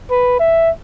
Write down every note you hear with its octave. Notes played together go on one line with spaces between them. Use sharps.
B4
E5